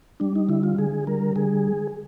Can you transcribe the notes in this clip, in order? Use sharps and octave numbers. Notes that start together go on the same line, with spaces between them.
G3 D4
D#4
D3 E4
F4
D3 G#4
G3 A#4
D3 G#4